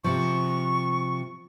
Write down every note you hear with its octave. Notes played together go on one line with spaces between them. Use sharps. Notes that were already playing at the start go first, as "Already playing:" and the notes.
C3 F3 C#6